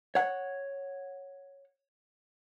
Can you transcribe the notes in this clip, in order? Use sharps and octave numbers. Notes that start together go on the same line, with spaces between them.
C#5 F#5